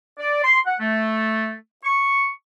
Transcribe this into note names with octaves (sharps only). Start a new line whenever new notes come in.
D5
C6
F#5
A3
C#6